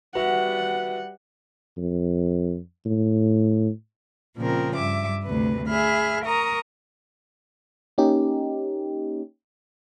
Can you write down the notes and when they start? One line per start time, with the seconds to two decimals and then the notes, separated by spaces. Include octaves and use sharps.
0.15 G3 F#4 B4 E5 F#5
1.77 F2
2.86 A2
4.37 A#2 C#3 F3 C4 A#4
4.74 G2 E5 D6
5.24 D2 C3 B4
5.67 G#4 E5 B5 F6
6.25 A#4 A#5 C#6 D#6
7.98 A#3 C#4 D#4 G4